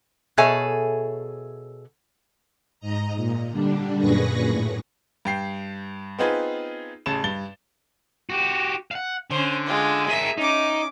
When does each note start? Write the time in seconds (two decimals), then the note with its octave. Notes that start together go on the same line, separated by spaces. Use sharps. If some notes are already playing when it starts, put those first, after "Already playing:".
0.38 B2 G#4 A4 C#5 E5 G#5
2.80 G#2 D#5 A#5
3.16 A#2
3.51 D3 G3 D4
3.99 F#2 A#2 G#4 B4 C#6 A#6
4.47 A2
5.25 G2 G5 C7
6.18 B3 C4 D#4 F4 G#4 B4
7.06 A1 C#3 A5 E7
7.24 G2 A6 G7
8.30 F#4 G4
8.91 F5 F#5
9.31 D3 C#4 C5
9.66 G#3 F4
10.08 G#4 A#4 E5
10.37 C#4 D#4 D6